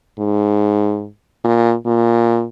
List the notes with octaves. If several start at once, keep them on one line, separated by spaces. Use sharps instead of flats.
G#2
A#2
A#2